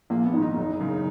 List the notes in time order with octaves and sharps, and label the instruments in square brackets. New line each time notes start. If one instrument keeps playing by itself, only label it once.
[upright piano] A#1 [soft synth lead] A#3
[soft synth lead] B3
[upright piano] G#2 D#3
[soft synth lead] D#4
[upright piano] F#1
F#2 C#3